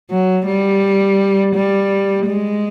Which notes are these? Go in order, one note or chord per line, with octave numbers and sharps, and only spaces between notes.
F#3
G3
G3
G#3